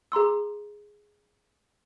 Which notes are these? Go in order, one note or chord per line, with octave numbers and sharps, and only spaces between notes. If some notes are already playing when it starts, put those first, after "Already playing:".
G#4 A#5 C6 E6